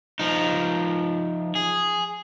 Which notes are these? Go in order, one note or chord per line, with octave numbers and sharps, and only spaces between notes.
F3 D#4
G#4